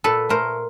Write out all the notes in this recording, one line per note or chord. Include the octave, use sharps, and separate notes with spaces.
A#2 A4 B4
A3 A#4 C5